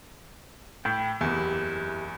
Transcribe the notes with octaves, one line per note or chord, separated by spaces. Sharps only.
A2 G5 B5 G6
F#1 E2 E4 G4 E5